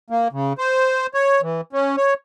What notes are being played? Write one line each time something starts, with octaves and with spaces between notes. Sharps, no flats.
A#3
C#3
C5
C#5
E3
C#4
C#5